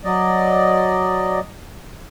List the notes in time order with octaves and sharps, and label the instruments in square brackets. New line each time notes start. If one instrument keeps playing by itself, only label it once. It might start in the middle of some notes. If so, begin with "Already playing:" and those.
[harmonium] F#3 D5 D#5